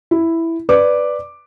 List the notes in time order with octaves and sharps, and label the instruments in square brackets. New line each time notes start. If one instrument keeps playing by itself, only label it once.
[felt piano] E4
B4 D5 D6